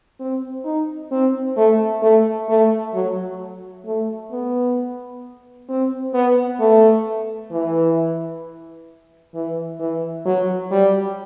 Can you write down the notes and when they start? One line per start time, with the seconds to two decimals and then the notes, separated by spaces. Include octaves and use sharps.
0.20 C4
0.65 D#4
1.11 C4
1.57 A3
2.02 A3
2.48 A3
2.94 F#3
3.86 A3
4.32 B3
5.69 C4
6.14 B3
6.60 A3
7.51 E3
9.34 E3
9.80 E3
10.26 F#3
10.71 G3